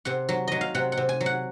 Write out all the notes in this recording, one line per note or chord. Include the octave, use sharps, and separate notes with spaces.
C3 F#5
F#3
F#3 D#5
F5
C3 F#5
F#5
C3
G#5
F#3
F#5